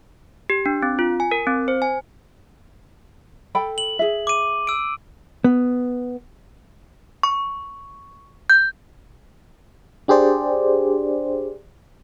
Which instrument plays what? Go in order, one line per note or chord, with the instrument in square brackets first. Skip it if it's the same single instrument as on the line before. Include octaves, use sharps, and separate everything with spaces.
[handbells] G4
D4
C4
F4
G#5
A#4
C4
C5
G#5
[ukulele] A4 G5 B5
[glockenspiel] F#7
[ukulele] G#4 E5
[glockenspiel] D6 D#7
E6 D7
[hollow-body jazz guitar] B3
[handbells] C#6
G6
[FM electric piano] D4 G4 G#4 C5 D5